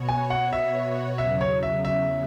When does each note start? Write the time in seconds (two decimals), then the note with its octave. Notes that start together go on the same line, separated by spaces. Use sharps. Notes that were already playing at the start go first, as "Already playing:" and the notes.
Already playing: B2 B3 F#4 C#5
0.09 G#5
0.30 F#5
0.53 E5
1.18 E2 C#3 F#3 E5
1.41 C#5
1.63 E5
1.85 E5